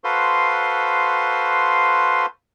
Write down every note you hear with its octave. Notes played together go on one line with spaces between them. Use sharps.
F#4 A4 B4 C5 F5 C6